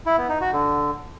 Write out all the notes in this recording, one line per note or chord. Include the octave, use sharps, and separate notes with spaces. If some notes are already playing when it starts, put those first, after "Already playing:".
E4
B3
D#4
F#4
D3